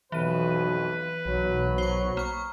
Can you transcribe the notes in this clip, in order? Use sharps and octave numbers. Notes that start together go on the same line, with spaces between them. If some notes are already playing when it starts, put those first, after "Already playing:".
B1 F2 B2 E3 B4 D#7
B1 F#3
C5 C#6
A#3 C#6